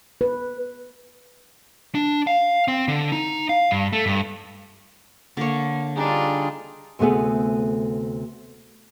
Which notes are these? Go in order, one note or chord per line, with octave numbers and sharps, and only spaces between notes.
B4
D4
F5
C4
D3
D#4
F5
G2
A3
G2
D3 A#3 C#5
G3 D4 D#4 F4 G#4
D2 C3 A3 B3 G#4